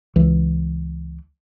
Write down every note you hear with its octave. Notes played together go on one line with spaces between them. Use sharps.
C#2 E3